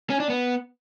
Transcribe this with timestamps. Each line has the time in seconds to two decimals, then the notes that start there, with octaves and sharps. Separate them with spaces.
0.10 C#4
0.20 D4
0.30 B3